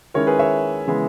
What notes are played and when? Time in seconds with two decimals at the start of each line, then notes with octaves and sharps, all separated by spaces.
0.14 D#3 G#3 C#4 E4 A#4 C#5
0.27 G#4 B4
0.39 C#5 E5
0.87 C#3 E3 G#3 B3 E4